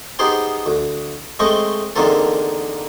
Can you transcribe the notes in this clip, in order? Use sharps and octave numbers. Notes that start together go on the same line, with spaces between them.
B3 D#4 G4 G#4 C5 G5
D2
G#3 A3 C4 D#5 G5 C#6
E2 D3 D#3 A#3 C4 A4